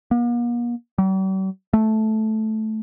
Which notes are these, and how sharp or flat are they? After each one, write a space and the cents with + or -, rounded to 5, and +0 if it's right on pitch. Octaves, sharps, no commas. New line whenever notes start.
A#3 +45
G3 -45
A3 -10